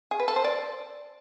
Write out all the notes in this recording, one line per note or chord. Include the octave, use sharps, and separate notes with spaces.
G#4
B4
A4
C5
D5